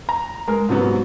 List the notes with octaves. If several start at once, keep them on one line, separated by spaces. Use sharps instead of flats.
A#5
G#3 A#4
G#2 C3 F#3 B3